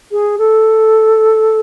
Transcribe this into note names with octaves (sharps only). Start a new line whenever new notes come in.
G#4
A4